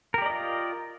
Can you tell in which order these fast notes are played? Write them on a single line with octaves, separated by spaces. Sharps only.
A#4 G4 D5 D#5 F4